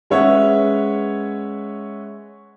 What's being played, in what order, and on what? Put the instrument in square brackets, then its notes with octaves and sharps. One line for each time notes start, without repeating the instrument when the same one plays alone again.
[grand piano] G#3 C#4 B4 C#5 E5 F#5